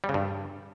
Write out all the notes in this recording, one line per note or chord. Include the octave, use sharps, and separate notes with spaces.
G3
C#3
G2